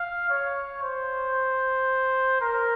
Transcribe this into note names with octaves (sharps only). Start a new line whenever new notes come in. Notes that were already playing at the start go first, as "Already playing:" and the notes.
Already playing: F5
C#5
C5
A#4